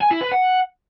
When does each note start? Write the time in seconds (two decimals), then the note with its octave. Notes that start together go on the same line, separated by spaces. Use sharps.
0.01 G#5
0.11 E4
0.21 B4
0.31 F#5